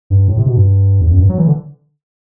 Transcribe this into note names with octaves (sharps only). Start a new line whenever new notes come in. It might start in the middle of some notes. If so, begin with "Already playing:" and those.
G2
A2
C3
B2
G2
E2
F#2
G2
F#3
E3
D3